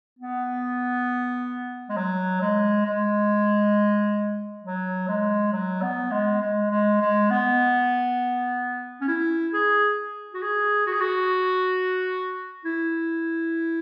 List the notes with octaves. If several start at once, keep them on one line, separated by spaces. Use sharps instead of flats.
B3
G#3
F#3
G#3
G#3
F#3
G#3
F#3
B3
G#3
G#3
G#3
G#3
B3
C#4
E4
G#4
F#4
G#4
F#4
G#4
F#4
E4